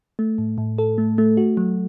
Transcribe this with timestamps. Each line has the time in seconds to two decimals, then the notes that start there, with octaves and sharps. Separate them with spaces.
0.19 A3
0.38 A2
0.58 A2
0.78 A4
0.98 A3
1.18 A3
1.37 F#4
1.57 F#3